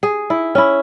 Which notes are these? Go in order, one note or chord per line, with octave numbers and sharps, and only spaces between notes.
G#4
E4
C#4 E4